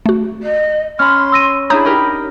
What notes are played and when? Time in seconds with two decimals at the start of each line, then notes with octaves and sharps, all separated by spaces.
0.06 A3 F#4
0.42 D#5
0.99 C#4 B5 C6 F6
1.32 E6 A#6 D#7
1.70 D4 E4 G#4 C#5 A#5 B5 D#6 G6
1.85 D#4 G4 A#4